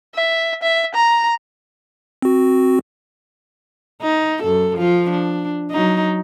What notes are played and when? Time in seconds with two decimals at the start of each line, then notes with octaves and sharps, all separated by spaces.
0.15 E5
0.62 E5
0.95 A#5
2.22 C4 F#4
4.02 D#4
4.43 F#2 A4
4.77 F3 F4
5.10 D4
5.71 F#3 D#4